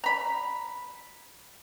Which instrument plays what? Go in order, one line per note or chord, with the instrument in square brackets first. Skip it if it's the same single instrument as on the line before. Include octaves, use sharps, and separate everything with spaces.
[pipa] A#5 B5